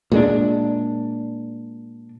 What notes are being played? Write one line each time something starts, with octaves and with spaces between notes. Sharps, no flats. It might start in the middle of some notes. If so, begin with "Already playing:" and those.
A#2 G#3 A3 D4